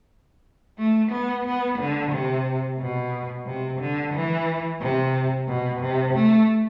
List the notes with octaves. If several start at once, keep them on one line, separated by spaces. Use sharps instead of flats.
A3
B3
B3
D3
C3
B2
C3
D3
E3
C3
B2
C3
A3